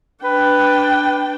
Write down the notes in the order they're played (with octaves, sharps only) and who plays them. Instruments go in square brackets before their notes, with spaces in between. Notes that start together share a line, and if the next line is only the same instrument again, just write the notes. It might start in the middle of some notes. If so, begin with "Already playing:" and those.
[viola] D4 G5 [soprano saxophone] B4